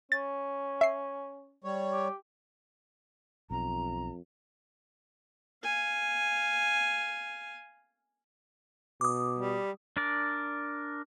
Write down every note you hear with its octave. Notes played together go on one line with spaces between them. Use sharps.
C#4 A6
E5 C7
G3 C#5
G4
B1 F2 A#5
F5 G#5
B2 D6 D#6
G3
D4 A#4 D5